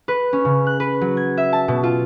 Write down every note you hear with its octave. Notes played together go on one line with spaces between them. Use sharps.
B4
C#4
C#3
F#6
B4
F#3
G#6
E5
A5
B2
F4